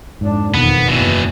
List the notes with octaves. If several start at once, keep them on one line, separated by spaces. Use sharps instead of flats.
F2 G#2 D4
E1 F2 D#3 B3
F#1 E2 B2 E3